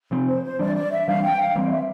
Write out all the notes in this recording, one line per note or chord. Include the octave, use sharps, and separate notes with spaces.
C3 F3 C4
C5
C5
E3 G3 D4 D5
D5
E5
E3 G3 D4 F5
G5
F5
E3 G3 C4
D5
E5